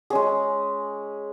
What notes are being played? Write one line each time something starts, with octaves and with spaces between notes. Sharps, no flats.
G#3 C#4 G#4